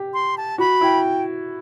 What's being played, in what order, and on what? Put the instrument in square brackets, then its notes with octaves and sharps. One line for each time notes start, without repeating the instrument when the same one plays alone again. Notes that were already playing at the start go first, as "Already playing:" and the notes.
Already playing: [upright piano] G4
[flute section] C6
A5
[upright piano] F#4 [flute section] B5
[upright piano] E4 [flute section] G5